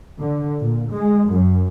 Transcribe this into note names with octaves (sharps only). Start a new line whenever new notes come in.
D3
A#2
G#3
F#2